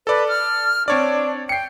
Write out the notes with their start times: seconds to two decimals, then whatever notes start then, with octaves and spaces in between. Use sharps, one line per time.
0.07 A4 B4 D5
0.28 F6
0.88 C4 D4 C#5 D5
1.49 G5 C7 C#7